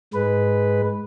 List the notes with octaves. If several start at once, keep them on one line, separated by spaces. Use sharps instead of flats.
G#2 G#3 B4